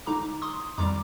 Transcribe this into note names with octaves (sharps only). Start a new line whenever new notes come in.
D3 G#3 D#4 A#5 D6
C6 D#6
F2 D#3 G3 A#5 D6